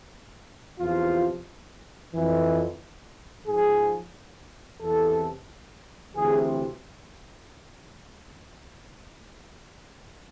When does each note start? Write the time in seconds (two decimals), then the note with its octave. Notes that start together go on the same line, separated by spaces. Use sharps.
0.80 E2 C3 F3 F4
2.14 F2 E3
3.47 G#2 F3 G#4
4.81 E2 C3 E3 A4
6.14 D2 C3 E3 G#4